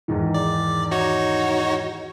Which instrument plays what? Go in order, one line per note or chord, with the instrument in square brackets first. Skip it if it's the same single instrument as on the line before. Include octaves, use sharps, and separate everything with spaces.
[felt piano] E2 G#2 D#3
[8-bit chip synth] D5
D#4 F#4 C#5